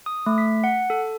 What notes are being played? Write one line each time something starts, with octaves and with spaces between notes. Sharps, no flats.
D#6
A3
B6
F#5
A4